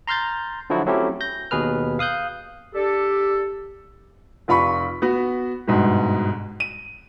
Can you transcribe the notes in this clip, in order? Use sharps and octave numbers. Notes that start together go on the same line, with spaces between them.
A#5 C6 F6 G6 A6
D3 F3 F#3 E4 F#4
F#3 A3 C4 C#4 E4 G4
G6 A#6
D#2 B2 G#4 B4 F6
F5 D#6 F#6 G6
D4 G4 A4
F1 F4 B5 C#6 B6
B3 F#4
G1 G#2 B2
D#7